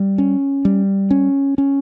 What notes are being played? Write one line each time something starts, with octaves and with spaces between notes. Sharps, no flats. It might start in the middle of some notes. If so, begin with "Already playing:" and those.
Already playing: G3
C#4
G3
C#4
C#4